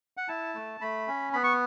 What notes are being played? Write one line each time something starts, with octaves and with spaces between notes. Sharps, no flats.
F#5
E4 A5
A3
A3 B5
C#4
B3 B5
C#6